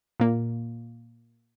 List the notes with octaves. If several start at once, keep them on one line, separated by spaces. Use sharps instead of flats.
A#2 A#3